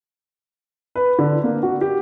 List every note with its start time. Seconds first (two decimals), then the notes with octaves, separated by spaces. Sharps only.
0.96 B4
1.19 D3
1.43 A#3
1.63 F#4
1.81 G4